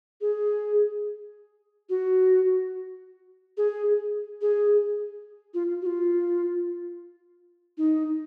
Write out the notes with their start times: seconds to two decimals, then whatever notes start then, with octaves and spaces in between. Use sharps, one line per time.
0.21 G#4
1.90 F#4
3.57 G#4
4.41 G#4
5.54 F4
5.82 F#4
5.86 F4
7.78 D#4